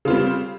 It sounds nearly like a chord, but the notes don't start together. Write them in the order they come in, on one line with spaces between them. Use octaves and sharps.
C#3 F4 C4 G3